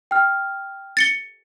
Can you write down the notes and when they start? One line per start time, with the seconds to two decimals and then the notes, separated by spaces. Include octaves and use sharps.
0.11 G5 F6
0.97 A6 C#7 G7